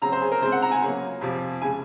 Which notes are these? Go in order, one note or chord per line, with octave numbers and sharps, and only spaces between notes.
C#3 F#3 C4 A#5
C5
G#4
A#4
C#3 G#3 C4 C5
F#5
A#5
G#5
C#3 F#3 A#3
F2 C3 F3
C#3 G#3 G#5